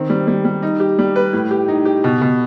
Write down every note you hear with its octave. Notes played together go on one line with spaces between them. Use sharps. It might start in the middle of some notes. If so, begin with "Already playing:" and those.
Already playing: D#3 C4
G3
G3
G3
D#4
G4
G3
B4
A2
G4
D#4
G4
B2
B2